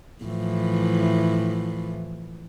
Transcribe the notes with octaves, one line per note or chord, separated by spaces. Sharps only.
A2 E3 F3